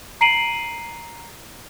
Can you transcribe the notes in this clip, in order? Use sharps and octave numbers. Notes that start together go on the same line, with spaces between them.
A#5 C7 D7 D#7 F#7